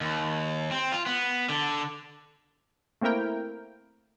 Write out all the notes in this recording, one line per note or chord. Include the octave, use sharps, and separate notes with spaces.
D#2
C4
F4
B3
D3
A3 A#3 C4 E4 A#4 G5